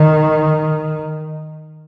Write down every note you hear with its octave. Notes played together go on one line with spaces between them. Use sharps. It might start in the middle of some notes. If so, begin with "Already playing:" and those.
Already playing: D#3